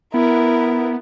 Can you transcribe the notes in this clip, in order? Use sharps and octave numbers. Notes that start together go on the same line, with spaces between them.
B3 E4 A#4